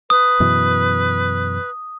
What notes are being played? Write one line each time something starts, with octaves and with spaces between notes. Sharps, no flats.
B4 D#6
F#2 B2 E3